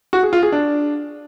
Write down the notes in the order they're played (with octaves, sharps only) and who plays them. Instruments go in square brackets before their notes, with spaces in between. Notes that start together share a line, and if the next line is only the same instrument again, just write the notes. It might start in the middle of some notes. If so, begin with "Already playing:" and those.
[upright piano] F#4
G#4
F4
G#4
D4